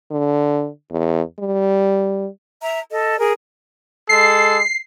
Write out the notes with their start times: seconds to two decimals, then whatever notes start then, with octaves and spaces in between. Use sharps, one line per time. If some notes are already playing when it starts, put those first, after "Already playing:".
0.11 D3
0.91 E2
1.39 G3
2.61 E5 A#5
2.90 A4 D#5
3.19 G#4 A#4
4.09 G#3 A4 C7